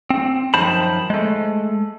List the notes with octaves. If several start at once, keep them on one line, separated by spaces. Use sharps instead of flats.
C4
F#2 D#3 F3 C5 A5 B5
G#3 A3